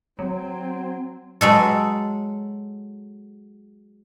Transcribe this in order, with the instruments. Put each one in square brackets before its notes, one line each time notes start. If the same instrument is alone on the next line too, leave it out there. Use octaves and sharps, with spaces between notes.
[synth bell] F#3 [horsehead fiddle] C4
[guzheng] F#3 G#3 A4